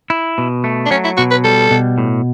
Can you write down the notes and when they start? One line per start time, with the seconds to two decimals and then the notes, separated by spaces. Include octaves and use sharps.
0.10 E4
0.38 B2
0.64 A3
0.86 D4
0.91 F#3 C#4
1.04 E4
1.17 B2 F#4
1.31 B4
1.44 G3 A4
1.71 B2
1.98 A2